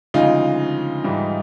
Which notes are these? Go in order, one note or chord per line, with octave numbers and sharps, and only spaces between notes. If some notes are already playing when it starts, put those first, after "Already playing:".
D2 C#3 F3 G#3 D#4 F4
G#2 E3 G3